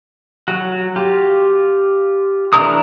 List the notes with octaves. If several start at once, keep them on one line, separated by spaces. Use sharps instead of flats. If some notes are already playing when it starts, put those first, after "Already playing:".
F#3 F#4
F4 G4
E3 A3 D4 A#4 D#6